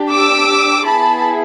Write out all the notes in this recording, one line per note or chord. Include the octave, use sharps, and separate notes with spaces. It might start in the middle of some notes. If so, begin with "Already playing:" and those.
Already playing: D4 G4
D6 E6
B3 E4 G#4 A5 B5